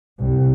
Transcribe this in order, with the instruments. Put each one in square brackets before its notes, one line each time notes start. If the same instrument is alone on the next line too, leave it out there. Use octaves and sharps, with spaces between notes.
[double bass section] C2